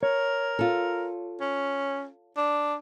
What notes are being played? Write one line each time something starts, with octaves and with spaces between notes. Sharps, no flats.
A#4 C#5
F4 A4
C#4
D4